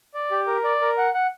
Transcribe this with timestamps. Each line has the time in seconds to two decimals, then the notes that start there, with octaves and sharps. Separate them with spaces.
0.14 D5
0.31 G4
0.47 A#4
0.64 D5
0.82 A#4
0.98 F#5
1.14 F#5